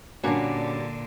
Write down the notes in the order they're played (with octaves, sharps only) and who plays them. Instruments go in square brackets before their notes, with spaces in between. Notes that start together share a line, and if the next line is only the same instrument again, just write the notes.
[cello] A#2 D3 [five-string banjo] G3 A#3 F#4 [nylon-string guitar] C#4 D4